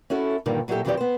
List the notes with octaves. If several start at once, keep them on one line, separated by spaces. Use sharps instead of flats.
C#4 E4 F#4 A4
G2 A#2 D3 D#3 G3
A#2 F#3 E4 F#4 G4 A4
F2 D#3 E3 F#3 G4 D5
B3 C5